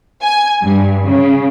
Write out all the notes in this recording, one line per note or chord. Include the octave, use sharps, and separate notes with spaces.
G#5
G2
C#3